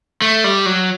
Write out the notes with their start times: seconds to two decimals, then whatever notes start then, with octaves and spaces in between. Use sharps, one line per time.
0.22 A3
0.44 G3
0.66 F#3